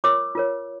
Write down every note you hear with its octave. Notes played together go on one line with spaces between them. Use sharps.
F4 A#4 C#5 D6 E6
F4 A#4 C#5